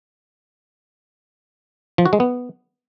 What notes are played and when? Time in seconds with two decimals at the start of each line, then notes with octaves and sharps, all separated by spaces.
1.98 F3
2.06 F#4
2.13 G#3
2.20 B3